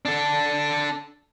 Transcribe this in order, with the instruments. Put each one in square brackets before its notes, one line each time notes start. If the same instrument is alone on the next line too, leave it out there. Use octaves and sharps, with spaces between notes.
[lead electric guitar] D4 A4